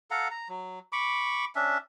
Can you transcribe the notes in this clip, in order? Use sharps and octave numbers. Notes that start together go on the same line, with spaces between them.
A4 F5 F#5 A#5
A#5
F#3
B5 C#6 D6
C#4 D4 E5